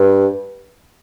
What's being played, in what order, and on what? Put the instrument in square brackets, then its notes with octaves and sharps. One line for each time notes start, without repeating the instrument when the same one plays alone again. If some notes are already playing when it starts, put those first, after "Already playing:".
Already playing: [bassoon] G2